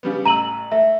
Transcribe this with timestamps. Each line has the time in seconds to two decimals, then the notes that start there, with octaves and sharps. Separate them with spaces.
0.03 C#3 G3 B3
0.26 A1 A#5 E6 D#7 F#7
0.72 A3 E5